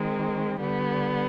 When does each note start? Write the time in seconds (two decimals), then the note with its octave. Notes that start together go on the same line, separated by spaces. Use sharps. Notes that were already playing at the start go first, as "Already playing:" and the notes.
Already playing: D#3 G#3 C4
0.60 D3 G3 B3